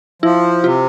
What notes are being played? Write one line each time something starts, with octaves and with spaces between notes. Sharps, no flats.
F3 E4
C3 F4